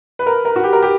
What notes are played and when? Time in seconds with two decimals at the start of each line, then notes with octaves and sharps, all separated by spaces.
0.19 B4
0.26 A#4
0.45 A#4
0.56 F#4
0.64 G4
0.73 A#4
0.83 G4